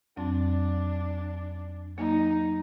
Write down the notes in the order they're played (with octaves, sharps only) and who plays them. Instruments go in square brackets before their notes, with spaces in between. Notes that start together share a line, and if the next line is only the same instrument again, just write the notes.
[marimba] F2 F#3 C4 [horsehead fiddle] D4
[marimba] F#3 A#3 [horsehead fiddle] D#4